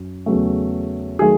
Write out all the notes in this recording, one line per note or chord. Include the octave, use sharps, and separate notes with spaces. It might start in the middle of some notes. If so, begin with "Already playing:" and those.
Already playing: F#2
E2 C#3 F#3 A3
D#3 F#3 A3 G#4